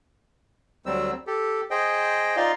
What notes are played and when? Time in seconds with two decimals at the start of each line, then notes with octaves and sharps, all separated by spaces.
0.86 D2 F#3 G3 C4 E6
1.27 G4 A4
1.71 G#4 C5 D#5 G5
2.37 D#4 F4 D5 D#5 F5 C6